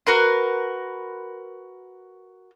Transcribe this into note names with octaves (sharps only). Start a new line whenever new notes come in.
F#4 A#4 B4 C6